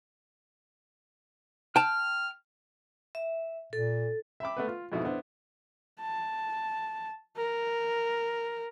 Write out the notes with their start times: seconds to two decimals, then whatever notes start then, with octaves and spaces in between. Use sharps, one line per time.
1.76 G5 A5 F6
3.15 E5
3.73 A#2 A4
4.40 E5 G5 B5 D6
4.57 A3 B3 B4
4.68 F4
4.92 F2 G#2 B2 E4
5.05 B3 D4 E4 C5
6.01 A5
7.36 A#4